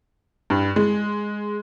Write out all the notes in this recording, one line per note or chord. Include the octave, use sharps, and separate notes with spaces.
G2
G#3